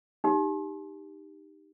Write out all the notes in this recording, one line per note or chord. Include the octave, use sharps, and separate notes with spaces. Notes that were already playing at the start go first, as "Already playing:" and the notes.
D#4 G4